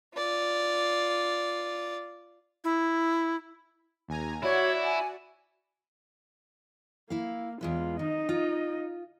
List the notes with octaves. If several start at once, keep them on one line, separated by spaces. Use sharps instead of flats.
F4 D5
E4
D#2 G#5 A#5
E4 F#4 C#5 D5 F#5
G#5
A#3 E4 F5
E2 G#3 F4 B4
D#3 D#4 D#5
F4